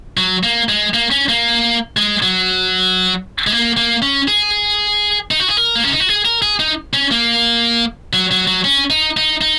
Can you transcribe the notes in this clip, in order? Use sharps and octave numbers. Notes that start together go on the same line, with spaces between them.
F#3
A#3
G#3
A#3
C#4
A#3
G#3
F#3
G#3
A#3
A#3
C#4
G#4
D#4
F#4
G#4
A#4
A#3
C#4
D#4
F#4
G#4
A#4
G#4
D#4
C#4
A#3
F#3
F#3
F#3
C#4
D#4
D#4
D#4